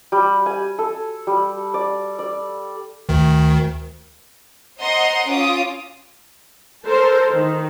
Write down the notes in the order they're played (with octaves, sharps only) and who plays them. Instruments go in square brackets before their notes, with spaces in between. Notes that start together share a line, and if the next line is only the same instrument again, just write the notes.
[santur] G3
G#5
A4
G3
D5
D5
[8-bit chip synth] D2 D#3
[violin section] C5 D#5 F#5 A#5 C6 D#6
C#4 F4 D6 D#6
[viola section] A4 A#4 C5
D#3